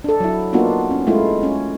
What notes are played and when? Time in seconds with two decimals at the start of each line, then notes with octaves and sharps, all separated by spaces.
0.04 D4 A4
0.20 F#3 E4
0.53 A#3 B3 D4 D#4 F4 F#4
0.91 C#4
1.07 G#3 A3 E4 F4
1.43 C#4